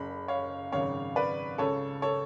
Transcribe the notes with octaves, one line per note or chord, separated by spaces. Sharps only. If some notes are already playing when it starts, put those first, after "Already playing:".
Already playing: F#1 F#2 C#3 B5
C#5 F5
G#1 F#2 C#3 C#5 F5
B4 D5
C#2 C#3 A4 C#5
A4 C#5